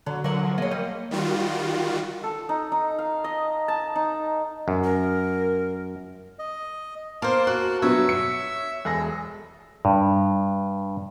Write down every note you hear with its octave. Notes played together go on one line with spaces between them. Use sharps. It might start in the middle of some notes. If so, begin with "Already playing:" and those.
D3 F#3
D3 F#3 A#4 F#5
F3
G#3 A#3 C#5 D#5
G3
D#3 G3 F4 F#4
A4
D#4
D#4
F5
D#5
A5
D#4
F#2
A#4
D#5
A#3 A#4 C5 A5
F#4 F#6
G2 B2 F#3 C#5 E5 E6
C#7
E1 G#4 A4 A#6
G2